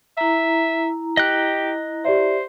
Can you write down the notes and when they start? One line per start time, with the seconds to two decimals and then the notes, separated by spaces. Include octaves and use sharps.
0.18 E4 E5 A#5
1.17 G4 D#5 F#6
2.05 G4 C5 D5 E5